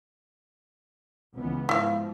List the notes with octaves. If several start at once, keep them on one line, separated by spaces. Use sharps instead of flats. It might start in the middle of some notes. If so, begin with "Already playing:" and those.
C#2 E3 B3
G#2 F3 E4 F5